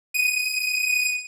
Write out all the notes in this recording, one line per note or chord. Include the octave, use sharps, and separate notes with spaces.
D#7